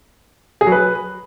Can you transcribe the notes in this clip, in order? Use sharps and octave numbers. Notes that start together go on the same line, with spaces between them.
G#4
F#3
B4